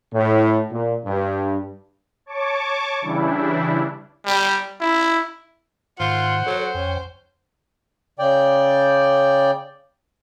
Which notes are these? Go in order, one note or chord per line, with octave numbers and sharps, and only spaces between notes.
A2
A#2
G2
C#5 A5 C#6 D6
C#3 E3 G3 D4 E4
G3
E4
G#2 D#3 F4 C5 F#5
F#3 A4 C#5
F2 C#4 G5
C#3 D5 G5